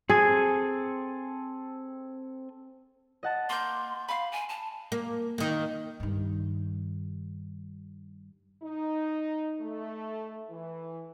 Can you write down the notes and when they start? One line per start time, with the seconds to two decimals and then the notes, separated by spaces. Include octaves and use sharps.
0.10 C4 G#4 A4 G#5
3.23 D#5 F#5 A5
3.49 A#3 C6 G6
4.09 F5 B5 C6
4.32 G#5
4.49 A5
4.92 A#3
5.38 D#3 A#3
6.00 G2 D#3
8.63 D#4
9.59 A3
10.50 E3